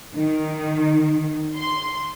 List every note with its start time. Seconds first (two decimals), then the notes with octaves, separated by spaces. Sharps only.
0.16 D#3
1.57 C6